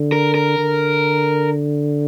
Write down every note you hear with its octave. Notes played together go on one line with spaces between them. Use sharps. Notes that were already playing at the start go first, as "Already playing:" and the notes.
Already playing: D3
A#4
A#4
D3